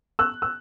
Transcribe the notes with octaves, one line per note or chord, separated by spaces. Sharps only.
E6 F#6
E6